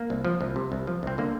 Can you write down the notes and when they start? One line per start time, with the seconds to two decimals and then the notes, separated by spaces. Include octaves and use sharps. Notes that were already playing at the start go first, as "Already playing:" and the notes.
Already playing: A#3
0.10 C2
0.25 F3
0.41 C2
0.56 C3
0.72 C2
0.87 F3
1.03 C2 C4
1.18 D3 A#3